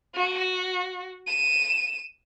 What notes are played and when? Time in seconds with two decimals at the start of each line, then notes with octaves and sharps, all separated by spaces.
0.15 F#4
1.27 D#7 E7